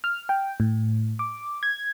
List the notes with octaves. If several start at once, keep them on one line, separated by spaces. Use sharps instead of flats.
F6
G5
A2
D6
G#6